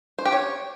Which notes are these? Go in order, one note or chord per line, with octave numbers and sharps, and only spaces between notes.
C5
G4
C#5